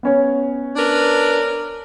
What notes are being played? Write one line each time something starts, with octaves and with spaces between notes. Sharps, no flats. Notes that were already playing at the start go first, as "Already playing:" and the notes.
B3 C#4 C#5
D4 A#4 B4